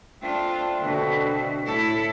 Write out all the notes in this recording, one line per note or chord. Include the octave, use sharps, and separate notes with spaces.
A3 C4 D4 F4
B2 D3
A2 E4 A4